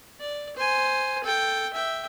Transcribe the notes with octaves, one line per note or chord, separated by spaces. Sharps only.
D5
C5 G#5
A4 G5
E5 G5